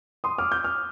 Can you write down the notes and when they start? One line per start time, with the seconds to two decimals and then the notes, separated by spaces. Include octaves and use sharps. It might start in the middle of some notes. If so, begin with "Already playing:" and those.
0.24 C6 D#6
0.38 D6 F6
0.52 D#6 G6
0.64 D6 F6